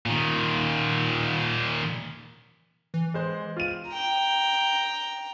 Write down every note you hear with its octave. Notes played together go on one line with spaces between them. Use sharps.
A#2 D#3
E3
G#3 C5
F4 D#7
G5 A#5